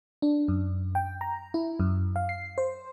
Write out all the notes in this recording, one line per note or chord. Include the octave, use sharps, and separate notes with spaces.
D4
F#2
G5
A#5
E4
F#2
F5
C7
C5